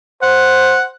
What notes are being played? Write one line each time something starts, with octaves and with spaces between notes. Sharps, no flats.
C5 F#5